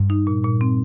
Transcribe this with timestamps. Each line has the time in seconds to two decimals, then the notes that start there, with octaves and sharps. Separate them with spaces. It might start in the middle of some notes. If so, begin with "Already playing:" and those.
Already playing: G2
0.10 D#4
0.27 A#2
0.44 A#2
0.61 C4